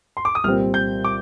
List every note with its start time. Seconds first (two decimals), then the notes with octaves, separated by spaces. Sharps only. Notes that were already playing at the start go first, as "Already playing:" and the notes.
0.17 C6
0.25 D6
0.35 D#6
0.44 C2 A#2 G3 C4 F6
0.74 G6
1.05 D6